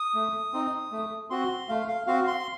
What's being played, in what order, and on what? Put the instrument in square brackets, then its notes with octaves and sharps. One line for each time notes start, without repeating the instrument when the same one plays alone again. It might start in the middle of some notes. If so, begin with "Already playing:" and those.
Already playing: [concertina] D#6
A3
C4 D#4
A3
C4 F#4 C6
A3 F5
F5
C4 F#4 F5
C6